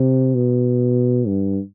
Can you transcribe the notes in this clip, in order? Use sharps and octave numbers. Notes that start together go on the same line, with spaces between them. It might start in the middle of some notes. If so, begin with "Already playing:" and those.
Already playing: C3
B2
G2